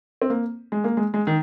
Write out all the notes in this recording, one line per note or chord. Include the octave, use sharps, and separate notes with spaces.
C4
A#3
G#3
A#3
G#3
G#3
D#3